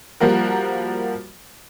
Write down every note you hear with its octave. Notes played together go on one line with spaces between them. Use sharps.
F3 G3 A#3 F#4 A#4